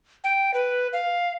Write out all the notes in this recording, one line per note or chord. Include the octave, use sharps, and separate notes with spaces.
G5
B4
F5